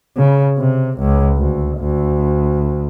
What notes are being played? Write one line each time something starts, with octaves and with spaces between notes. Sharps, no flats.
C#3
C3
C#2
D2
D2